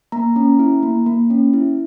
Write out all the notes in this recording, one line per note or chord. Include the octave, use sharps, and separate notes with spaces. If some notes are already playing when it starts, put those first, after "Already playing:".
A#3 A#5
C#4
E4
A#3
A#3
C#4
E4